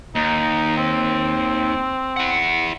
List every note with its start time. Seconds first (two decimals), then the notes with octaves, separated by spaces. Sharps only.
0.15 D#2 D#4
0.77 C4
2.17 E4 F#5